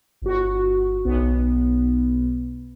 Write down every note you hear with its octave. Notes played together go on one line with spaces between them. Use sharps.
G1 F#4
B1 B3